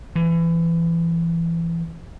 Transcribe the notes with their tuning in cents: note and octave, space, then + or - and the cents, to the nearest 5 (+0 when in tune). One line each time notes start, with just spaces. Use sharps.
E3 +25